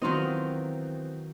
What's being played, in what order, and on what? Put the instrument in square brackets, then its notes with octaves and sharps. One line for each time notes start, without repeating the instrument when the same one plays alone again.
[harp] D#3 D#4 [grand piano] E3 B3 C4 [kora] F#3 F4 D#5